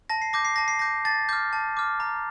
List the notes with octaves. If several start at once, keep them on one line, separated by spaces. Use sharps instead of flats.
A5 A#6
C7
D6 G6 A#6
C7
A5 A#6
C7
D6 G6 A#6
A5 A6
D6 F6 G6
A5
D6 F6
A#5